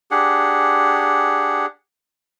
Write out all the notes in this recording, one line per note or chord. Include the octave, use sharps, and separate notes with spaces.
D4 G4 G#4 F#5